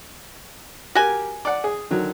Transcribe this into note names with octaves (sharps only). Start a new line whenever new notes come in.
F#4 G4 A#4 G#5
D5 F#5
G#4
D3 D#3 F#3